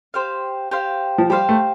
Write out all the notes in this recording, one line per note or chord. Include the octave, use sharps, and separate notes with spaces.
G4 C5 F5
G4 C5 F5
F3
G3 G4 C5 F5
A3